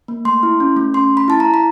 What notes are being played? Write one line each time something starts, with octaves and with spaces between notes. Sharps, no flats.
A#3
A3 C6
E4
C#4
A3
C#4 C6
A3
B5
E4 A5
A#5
E4
B5